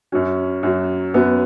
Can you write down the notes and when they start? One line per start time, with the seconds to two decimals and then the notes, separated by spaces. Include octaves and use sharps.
0.12 F#2 F#3 C#4
0.63 F#2 F#3
1.14 F#2 F#3 B3